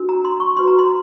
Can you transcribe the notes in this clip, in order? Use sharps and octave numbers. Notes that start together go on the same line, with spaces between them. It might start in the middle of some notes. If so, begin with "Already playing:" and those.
Already playing: D4 F#4 A#4
A#5
C6
C#6
D#4 F#4 B4 C6
A#5
C6